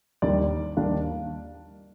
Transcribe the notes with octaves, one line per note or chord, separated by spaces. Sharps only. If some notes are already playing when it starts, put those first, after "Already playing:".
D#2 D#3 G3 D4 D5
D#2 D#3 G3 D4 F5